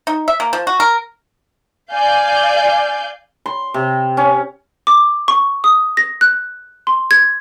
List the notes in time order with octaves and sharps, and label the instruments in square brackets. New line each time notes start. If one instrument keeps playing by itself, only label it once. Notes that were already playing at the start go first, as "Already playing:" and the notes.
[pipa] D#4
E5
A#3
F3
F#4
A#4
[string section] D5 F5 G#5 G6
[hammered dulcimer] C6
C3
C#4
[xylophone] D6
C#6
D#6
A#6
F#6
C6
G#6